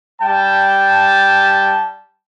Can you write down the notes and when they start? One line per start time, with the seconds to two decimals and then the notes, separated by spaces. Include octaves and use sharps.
0.22 G3 G5 A5